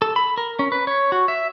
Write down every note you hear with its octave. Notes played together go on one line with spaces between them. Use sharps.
A4
B5
A#4
C#4
B4
C#5
F#4
E5